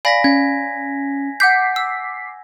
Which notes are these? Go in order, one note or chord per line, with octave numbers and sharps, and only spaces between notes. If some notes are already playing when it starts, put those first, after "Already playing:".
D5 F5 G#5 B5 A#6 B6
C#4 G#6
F#5 D6 G6 B6 C7
E6